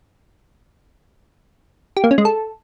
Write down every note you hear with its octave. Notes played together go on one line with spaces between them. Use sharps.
G4
A#3
C#4
G#3
A4